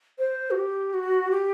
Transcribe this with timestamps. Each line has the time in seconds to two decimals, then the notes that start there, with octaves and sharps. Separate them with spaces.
0.18 C5
0.51 F#4
0.57 G4
0.94 F#4
1.31 G4